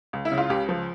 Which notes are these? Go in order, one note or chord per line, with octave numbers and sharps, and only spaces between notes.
C#2
E4
C#3
F4
C#2 G4
F3